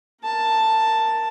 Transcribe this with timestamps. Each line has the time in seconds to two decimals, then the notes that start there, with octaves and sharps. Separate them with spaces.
0.23 A#4 A5